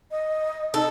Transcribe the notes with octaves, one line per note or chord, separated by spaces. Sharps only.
D#5
D#4 A4